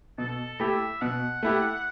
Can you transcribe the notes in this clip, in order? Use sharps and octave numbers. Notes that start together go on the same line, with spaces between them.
B2 A4
A3 E4 G4 E5
B2 F#5
A3 E4 G4